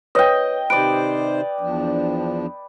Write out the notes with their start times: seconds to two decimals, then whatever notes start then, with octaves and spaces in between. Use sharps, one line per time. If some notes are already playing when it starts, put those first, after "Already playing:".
0.15 B4 C#5 D#5 G5
0.70 C3 D#3 B4 C5 D5 D7
1.60 E2 F3 D4